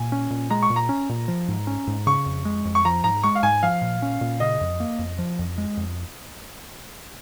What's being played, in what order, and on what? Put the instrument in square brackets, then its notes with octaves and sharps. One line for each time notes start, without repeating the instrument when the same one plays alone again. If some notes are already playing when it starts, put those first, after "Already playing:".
Already playing: [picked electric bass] A#2 [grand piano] G#5
[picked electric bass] C#4
A#2
[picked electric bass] G#3 [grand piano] A#5
[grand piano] C#6
[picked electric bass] A#2
[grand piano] A#5
[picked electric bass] C#4
A#2
F3
G#2
C#4
G#2
[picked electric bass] C#3 [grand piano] C#6
[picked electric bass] F2
G#3
F2
[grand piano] C#6
[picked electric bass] F3 [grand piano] A#5
[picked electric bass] G#2 [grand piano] A#5
[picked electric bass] G#3 [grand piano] C#6
[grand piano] F5
[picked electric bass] G#2 [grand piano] G#5
[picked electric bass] F3 [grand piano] F5
[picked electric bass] A#2
C#4
A#2
[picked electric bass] C#3 [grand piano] D#5
[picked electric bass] F2
A#3
F2
F3
F2
G#3
F2